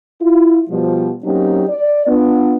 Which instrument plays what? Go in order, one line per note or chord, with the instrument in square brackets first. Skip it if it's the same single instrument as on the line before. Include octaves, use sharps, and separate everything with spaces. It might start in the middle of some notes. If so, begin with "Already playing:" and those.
[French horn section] E4 F4
B2 F3 G3
F#3 A#3 C4 C#4 D#4 G4
D5
B3 D4 F4